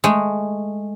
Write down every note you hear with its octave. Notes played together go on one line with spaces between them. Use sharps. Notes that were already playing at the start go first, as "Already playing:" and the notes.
G#3 A3